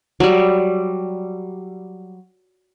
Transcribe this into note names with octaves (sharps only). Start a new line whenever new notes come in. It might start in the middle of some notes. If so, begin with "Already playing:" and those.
F#3 G3